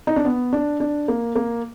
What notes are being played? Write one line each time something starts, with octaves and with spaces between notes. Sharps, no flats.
D#4
D4
B3
D4
D4
A#3
A#3